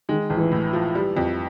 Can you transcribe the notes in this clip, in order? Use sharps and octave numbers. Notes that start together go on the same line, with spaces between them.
D#3 G#3
A1
E3
A2
F3
G3
F2